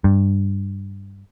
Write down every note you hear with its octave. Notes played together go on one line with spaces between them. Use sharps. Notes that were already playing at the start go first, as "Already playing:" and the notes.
G2